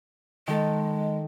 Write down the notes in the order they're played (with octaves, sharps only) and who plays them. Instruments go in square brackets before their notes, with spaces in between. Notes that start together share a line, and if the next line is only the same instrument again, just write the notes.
[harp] D#3 A4 [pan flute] G#3